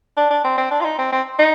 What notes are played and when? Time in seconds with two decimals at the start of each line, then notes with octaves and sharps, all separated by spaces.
0.17 D4
0.30 D4
0.44 C4
0.58 C4
0.71 D4
0.81 F4
0.85 D#4
0.98 C4
1.12 C4
1.39 D#4